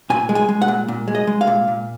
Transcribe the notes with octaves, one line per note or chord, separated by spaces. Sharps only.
A#2 G#5
G#3
G#5
G#3
F#5
A#2
A#2
G#3
D#5
G#3
F5
A#2
A#2